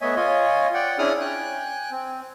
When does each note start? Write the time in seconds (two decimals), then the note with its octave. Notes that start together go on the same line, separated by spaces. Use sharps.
0.01 A3 B3 C#5 D#5 E5 G#5
0.16 F4 C#5 D#5 G#5
0.74 D5 F#5 G5
0.99 C#4 D4 E4 G#4 D#6 F6
1.21 G5 G#5 F#6
1.91 C4